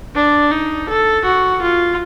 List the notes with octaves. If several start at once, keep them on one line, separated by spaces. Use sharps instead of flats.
D4
D#4
A4
F#4
F4